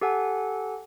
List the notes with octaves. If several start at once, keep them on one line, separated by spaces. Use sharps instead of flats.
G4 A4 F#5 G#5